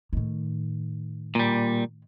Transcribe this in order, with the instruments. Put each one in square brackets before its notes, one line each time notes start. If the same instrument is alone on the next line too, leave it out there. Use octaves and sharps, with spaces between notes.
[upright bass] A2 D#3
[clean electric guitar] A#2 G3